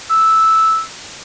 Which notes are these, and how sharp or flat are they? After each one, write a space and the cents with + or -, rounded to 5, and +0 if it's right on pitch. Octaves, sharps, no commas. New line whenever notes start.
E6 -10